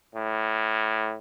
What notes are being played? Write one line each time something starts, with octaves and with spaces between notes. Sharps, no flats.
A2